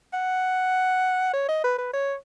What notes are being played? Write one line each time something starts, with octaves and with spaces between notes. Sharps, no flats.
F#5
C#5
D#5
B4
B4
C#5